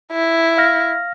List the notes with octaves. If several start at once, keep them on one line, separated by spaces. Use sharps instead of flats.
E4
F5 F6 A#6